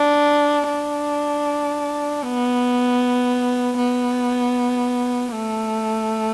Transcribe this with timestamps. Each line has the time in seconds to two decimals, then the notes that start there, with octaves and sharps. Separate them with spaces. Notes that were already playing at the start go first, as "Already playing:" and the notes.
Already playing: D4
0.68 D4
2.23 B3
3.77 B3
5.33 A3